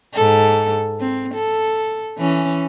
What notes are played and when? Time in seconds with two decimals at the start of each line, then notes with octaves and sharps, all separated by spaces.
0.14 G#2 A4
1.00 C4
1.34 A4
2.18 E3 C#4